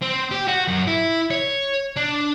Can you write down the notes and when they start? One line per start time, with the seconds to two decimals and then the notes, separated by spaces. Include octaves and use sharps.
0.02 C4
0.32 G4
0.48 F#4
0.68 F#2
0.87 E4
1.31 C#5
1.96 D4